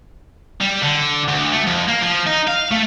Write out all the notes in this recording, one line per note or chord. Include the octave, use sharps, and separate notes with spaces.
G3
D3
D2
A3
F2
A#3
F3
D#4
F5
A3